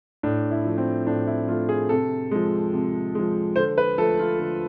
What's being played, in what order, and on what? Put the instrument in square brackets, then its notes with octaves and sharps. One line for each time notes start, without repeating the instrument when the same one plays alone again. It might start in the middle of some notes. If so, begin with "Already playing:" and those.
[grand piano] A2 D4
E4
F3 A3
C4
A2 D4
E4
F3 A3 F4
G#4
C3 A4
F3 G#3
C3
F3 G#3
D3 C5
B4
F3 A3 A4
F4
D3